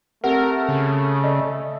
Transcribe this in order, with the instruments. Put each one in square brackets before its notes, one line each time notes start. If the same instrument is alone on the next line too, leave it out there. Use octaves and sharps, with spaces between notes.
[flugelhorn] A3 [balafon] C4 G4 F#5 [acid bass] A#4
[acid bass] C#3
[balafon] D5 D#5